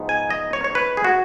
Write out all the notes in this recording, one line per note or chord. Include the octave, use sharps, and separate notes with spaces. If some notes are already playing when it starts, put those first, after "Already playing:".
Already playing: G#2 F3 G#3 B3 D#4
G#5
D#5
C#5
C#5
B4
G#4
F#4